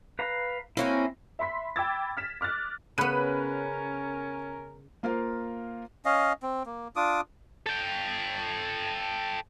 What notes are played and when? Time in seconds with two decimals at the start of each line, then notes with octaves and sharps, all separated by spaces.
0.19 B4 F5 A#5
0.77 A#3 C4 C#4 E4 F#4
1.39 E5 B5 C6 B6
1.76 G5 B5 D6 E6 G#6 A6
2.17 F6 B6 E7
2.41 D6 F6 F#6 A6
2.98 C#3 B3 C#4 A#4 B5 F#6 D#7
5.03 A#3 F4 A#4 C5 F5
6.05 C#4 D#5 F5
6.43 C4
6.66 A#3
6.96 D4 F4 D6 D#6
7.66 A4 G5